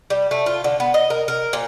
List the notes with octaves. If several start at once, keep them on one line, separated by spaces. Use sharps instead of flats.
G3
A3
F4
D3
B3
D#5
A#4
A#4
A#2